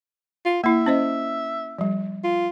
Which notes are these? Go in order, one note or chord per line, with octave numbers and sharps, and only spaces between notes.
F4
A#3 E4 E5
C#4 C5 D#5
F3 G3
F4